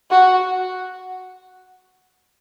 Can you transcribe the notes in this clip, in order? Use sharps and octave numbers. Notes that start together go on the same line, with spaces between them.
F#4